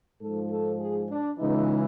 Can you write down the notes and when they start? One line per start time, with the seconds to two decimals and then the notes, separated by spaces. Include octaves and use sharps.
0.21 G#2 F3 A4
0.51 A4
0.80 G#4
1.09 D4
1.38 C#2 C#3 E3 D#4